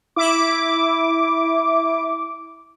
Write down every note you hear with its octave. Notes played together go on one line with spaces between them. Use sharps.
E4 D6